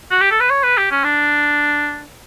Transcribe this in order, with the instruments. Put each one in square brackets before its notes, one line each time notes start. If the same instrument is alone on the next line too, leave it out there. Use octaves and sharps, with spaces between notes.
[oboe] F#4
G4
A4
B4
C#5
B4
G4
C#4
D4